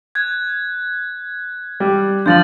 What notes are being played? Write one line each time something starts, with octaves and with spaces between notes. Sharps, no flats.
F#6 G#6
G3
D3 F3 G6 A6 F#7